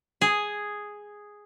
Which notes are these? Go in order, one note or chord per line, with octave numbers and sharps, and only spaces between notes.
G#4